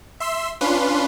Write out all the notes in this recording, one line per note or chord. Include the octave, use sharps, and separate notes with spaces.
E5 C6 E6
C#4 D4 F4 B4 C6